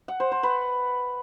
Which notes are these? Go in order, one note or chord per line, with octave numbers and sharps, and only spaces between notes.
F#5
C5
C5
B4